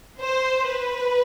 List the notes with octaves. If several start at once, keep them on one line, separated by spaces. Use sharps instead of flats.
C5
B4